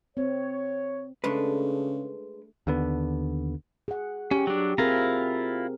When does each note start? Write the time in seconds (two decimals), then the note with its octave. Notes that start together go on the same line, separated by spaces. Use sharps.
0.17 C4 C#5
1.24 C#3 G#3 A3 D4 B4
2.67 D#2 D3 B3
3.88 G#4 F#5
4.31 C#4 G4
4.47 F#3 D4
4.78 C4 E4 F4 G#4 A#4 A#5